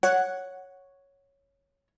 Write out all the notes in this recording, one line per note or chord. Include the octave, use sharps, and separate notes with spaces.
C#5 F#5